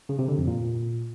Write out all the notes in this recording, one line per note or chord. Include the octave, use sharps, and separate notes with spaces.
C#3
C3
D3
F2
A#2